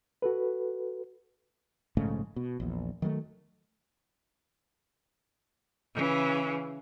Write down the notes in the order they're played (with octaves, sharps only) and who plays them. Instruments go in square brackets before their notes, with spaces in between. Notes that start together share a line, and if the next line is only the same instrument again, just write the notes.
[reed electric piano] F#4 A4 B4
[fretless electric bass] A#1 G#2 C#3 A3
B2
A#1 E2
D#3 F#3 G3 A3
[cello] C#3 E3